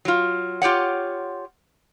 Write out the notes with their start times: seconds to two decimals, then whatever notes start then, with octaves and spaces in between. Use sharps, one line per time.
0.05 F#3 F4
0.62 F4 G4 C#5 F#5